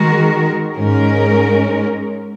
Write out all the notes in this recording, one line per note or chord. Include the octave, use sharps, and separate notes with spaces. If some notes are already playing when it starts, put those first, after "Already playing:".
Already playing: D#3 G#3 F#4 A#4
G#2 G#3 C#4 A#4